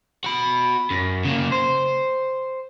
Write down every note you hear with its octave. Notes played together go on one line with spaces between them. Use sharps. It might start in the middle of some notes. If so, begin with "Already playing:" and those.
F#4 B5
F#2
C#3 A#3
C5